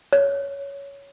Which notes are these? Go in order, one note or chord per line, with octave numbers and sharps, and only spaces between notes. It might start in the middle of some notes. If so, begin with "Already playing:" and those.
C#5